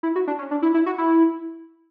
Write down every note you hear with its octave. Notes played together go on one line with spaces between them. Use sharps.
E4
F#4
D4
C#4
D4
E4
E4
F#4
E4